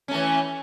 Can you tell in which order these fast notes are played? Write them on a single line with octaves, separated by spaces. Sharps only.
C#4 A3 E3